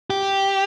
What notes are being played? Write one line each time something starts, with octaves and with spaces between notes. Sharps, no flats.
G4